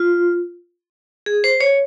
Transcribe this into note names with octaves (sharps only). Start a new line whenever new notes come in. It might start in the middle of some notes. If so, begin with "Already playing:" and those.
Already playing: F4
G#4
C5
C#5